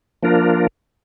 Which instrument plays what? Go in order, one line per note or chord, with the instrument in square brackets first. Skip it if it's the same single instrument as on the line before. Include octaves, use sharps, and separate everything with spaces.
[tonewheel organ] F3 A#3 D4 F4 A#4